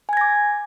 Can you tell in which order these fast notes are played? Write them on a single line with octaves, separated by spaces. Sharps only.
G#5 G#6 A#6 D6